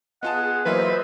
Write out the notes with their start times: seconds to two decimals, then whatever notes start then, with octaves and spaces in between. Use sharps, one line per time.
0.23 B3 F4 G#4 D#5 F#5 A5
0.65 E3 F#3 A#3 F4 B4 C5 D#5 E5